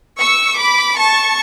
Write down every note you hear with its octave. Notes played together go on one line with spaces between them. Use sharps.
C#6 E6
B5 D6
A5 C#6